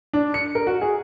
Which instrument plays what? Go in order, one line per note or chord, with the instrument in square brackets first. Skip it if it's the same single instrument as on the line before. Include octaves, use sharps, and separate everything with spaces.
[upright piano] D4
C#7
A#4
F#4
G#4